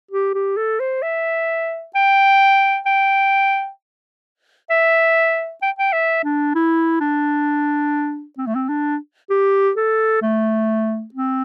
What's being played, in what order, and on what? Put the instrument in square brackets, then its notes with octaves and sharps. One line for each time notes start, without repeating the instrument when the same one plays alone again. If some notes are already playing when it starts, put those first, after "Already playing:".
[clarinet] G4
G4
A4
C5
E5
G5
G5
E5
G5
G5
E5
D4
E4
D4
C4
A3
C4
D4
G4
A4
A3
C4